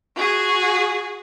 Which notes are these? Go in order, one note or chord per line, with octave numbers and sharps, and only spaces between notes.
F#4 G#4